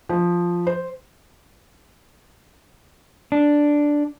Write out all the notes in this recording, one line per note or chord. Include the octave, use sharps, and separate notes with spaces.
F3
C5
D4